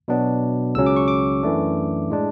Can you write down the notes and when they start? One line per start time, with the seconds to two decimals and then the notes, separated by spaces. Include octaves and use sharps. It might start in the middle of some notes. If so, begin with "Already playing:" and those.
0.08 B2 F#3 B3 D4
0.75 C#2 C#3 F#3 C#4 E6
0.86 D6
0.96 C#6
1.08 D6
1.43 F#2 E3 A3 D4
2.10 A2 G#3 D4